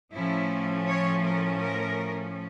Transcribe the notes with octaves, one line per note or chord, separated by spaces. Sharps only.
A2 F3 A3 C#4 E4
C#5
A#4
A#4